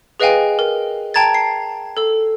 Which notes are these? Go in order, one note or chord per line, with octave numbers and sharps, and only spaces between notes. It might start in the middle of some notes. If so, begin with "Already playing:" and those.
G#4 B4 D#5 F5 G5 G#5
A#4
G5 A5 A#5 G#6 A6
C7
A4 E6